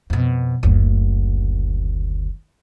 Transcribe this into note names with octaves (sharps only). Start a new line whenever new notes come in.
F2 B2
F#1 D2